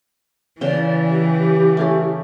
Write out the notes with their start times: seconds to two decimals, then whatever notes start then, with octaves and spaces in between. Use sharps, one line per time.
0.61 C#3 E3 D5 G5
1.08 G4
1.77 A3 C#4 G#4